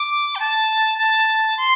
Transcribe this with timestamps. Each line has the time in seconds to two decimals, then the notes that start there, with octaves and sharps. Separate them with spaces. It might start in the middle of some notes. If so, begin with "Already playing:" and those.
Already playing: D6
0.35 G5
0.40 A5
0.98 A5
1.57 C6